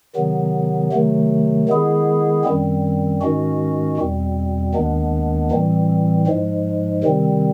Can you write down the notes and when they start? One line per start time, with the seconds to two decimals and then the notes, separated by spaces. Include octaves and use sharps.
0.16 C3 D#3 F#3 B3
0.92 C3 D#3 F#3 A3
1.69 D#3 G#3 B3 E4 G#4
2.44 F#2 D#3 G3 C4
3.22 G#2 D#3 G#3 C#4 F#4
3.97 E2 B2 G3 C4
4.74 D#2 D#3 G#3 B3 D4
5.51 A2 E3 G3 C4
6.27 G#2 F3 G#3
7.03 C3 D#3 G3 C4